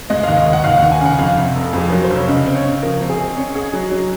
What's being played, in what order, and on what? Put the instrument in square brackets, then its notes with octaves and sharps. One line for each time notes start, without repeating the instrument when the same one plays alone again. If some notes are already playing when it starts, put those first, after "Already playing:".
[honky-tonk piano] G#3 [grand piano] D#5
[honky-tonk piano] D#2 [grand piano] F5
[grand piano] D#5
[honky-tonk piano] D#2
[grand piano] F#5
[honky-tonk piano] D#2 [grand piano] F5
[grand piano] F#5
[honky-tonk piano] D#2
[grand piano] G#5
[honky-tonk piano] C#3 [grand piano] F#5
[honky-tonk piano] F2 [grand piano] F5
[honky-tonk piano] C3
F1
[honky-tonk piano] F2 [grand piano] G#4
[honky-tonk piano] F#3 [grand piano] A#4
[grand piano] C5
[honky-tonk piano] F1
[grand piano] C#5
[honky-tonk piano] C#3 [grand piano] D#5
[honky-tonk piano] C4
[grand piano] C#5
[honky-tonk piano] C#3
[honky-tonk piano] F3 [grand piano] A#4
[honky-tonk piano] C4
[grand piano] G#4
[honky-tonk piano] C4
C#4
G#4
F#3
F#3